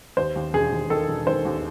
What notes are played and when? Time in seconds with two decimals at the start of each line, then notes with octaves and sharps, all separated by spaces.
0.17 D#2 C5
0.36 D#2
0.54 E1 G#4
0.72 D#2
0.90 D#3 A4
1.08 E1
1.27 D#3 C5
1.45 D#2